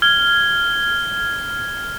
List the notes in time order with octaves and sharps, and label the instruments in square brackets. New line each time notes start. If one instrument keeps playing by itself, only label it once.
[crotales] F6 G#6 G7